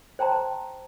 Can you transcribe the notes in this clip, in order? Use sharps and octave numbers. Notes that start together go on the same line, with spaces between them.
C5 G5 A5 A#5 C6